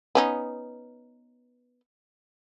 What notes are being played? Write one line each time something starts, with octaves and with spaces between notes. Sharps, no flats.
B3 C#4 D#4